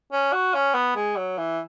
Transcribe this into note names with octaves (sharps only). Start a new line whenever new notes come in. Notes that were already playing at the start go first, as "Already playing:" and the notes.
C#4
F#4
C#4
B3
G#3
F#3
E3